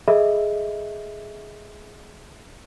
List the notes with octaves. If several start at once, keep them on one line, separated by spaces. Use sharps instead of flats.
G#4 A4 D#5 E5